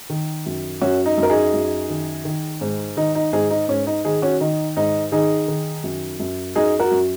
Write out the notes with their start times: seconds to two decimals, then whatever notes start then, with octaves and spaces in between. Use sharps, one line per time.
0.10 D#3
0.46 F#2
0.81 F#2 C#4 F#4
1.06 D#4
1.18 F#2
1.23 A#4
1.30 D#4 G#4
1.54 F#2
1.89 D#3
2.25 D#3
2.61 G#2
2.97 D#3 D#4
3.15 D#4
3.33 G#2 D#4 G#4
3.50 D#4
3.68 G#2 C#4
3.87 D#4
4.04 D#3 D#4 G#4
4.22 C#4 F#4
4.40 D#3 D#4
4.77 G#2 D#4
5.12 D#3 D#4 G#4
5.48 D#3
5.84 F#2
6.20 F#2
6.56 F#2 D#4 G#4
6.79 F#4 A#4
6.91 F#2